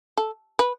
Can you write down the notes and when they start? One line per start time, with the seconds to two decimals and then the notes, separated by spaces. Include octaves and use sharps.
0.17 A4
0.59 B4